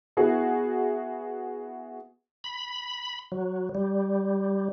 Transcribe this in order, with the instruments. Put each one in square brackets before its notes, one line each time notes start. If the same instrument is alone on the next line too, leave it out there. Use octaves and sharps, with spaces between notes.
[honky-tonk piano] B3 E4 F#4 G#4
[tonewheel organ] B5
F#3
G3